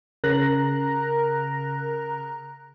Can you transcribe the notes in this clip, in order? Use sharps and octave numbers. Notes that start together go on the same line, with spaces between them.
C#3 A#4 A#5 F#6 A#6